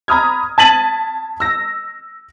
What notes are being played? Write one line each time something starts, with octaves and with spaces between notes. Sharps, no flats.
A#5 B5 D#6 F6 G#6
A5 G#6 A6 B6 D#7 F#7
E6 A#6